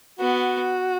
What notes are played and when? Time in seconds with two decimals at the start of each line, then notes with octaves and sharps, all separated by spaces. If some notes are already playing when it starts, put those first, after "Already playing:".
0.19 B3 F#4